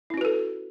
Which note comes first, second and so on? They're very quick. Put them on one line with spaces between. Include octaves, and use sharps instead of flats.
E4 C#4 F#4 B4 A4